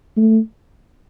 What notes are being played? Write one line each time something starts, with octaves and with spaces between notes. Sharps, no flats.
A3